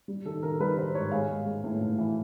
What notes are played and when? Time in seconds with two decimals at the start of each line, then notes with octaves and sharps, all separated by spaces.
0.08 G3
0.25 D#3 A4
0.43 D#3 A#4
0.60 G3 B4
0.77 D#3 C5
0.95 G#2 C#5
1.12 G#3 F5
1.29 G#3
1.46 G#3
1.64 A2
1.81 A2
1.98 E3